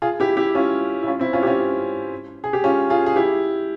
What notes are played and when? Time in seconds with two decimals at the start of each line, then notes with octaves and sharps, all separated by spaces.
0.02 F4 G#4
0.20 E4 G4
0.37 E4 G4
0.55 C#4 F4
1.03 E4
1.07 C#4 F4
1.20 C4 E4
1.33 C#4 F4
1.43 G4
1.46 C#4 F4
2.44 G#4
2.53 G4
2.64 C#4 F4
2.90 F4 G#4
3.06 G#4
3.16 E4 G4